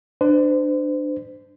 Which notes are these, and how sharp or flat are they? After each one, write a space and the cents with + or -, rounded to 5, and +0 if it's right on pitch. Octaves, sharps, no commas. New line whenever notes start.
D4 +20 C5 -35